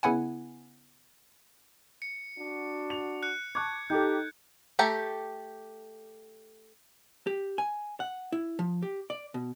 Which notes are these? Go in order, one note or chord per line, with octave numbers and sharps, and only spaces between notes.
C#3 B3 E4 F#5 G#5
C#7
D4 F#4
F7
F#6 C#7
A5 C#6 D6 F#6 G#6
D#4 G4 A4 G6
A3 G4 A4 G5 A#5
G4
G#5
F#5
E4
F3
G4
D5
B2